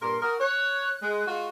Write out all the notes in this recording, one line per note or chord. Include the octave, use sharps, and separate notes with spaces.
G2 A#2 A#4 C6
F#4 A#4 D#6
C#5 F#6
G#3
G#3 F4 F#4